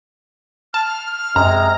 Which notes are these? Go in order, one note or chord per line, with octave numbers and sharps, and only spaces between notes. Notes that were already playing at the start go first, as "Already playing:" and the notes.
A5 F6
F#2 C3 G#3 A#5